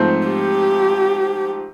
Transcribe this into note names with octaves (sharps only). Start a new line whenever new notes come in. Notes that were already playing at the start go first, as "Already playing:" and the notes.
Already playing: G#2 F3 A3 C4
G4